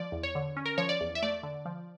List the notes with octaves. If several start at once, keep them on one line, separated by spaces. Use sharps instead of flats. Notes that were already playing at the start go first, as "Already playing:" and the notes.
Already playing: F3 D5
E2
C#5
D3
C#4
A#4
F3 C#5
D5
E2
E5
A3 D5
D3
F3